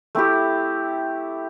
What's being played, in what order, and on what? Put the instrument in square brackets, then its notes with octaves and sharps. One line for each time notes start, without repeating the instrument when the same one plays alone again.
[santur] A3 C4 E4 G4